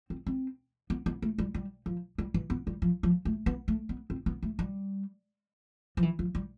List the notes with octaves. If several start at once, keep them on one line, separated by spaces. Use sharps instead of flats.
C4
C4
B3
B3
A3
G3
G3
F3
G3
E3
B3
G3
F3
F3
A3
B3
A3
B3
C4
B3
A3
G3
F3
E3
F3
G3